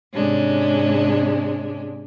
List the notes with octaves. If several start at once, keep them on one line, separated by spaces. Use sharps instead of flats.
G#2 C3 G#3 C#4 D4